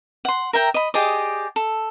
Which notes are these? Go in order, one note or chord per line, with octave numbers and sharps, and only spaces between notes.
F#5 C6
A#4 E5 G5 A#5
D#5 B5
G4 G#4 D5 D#5
A4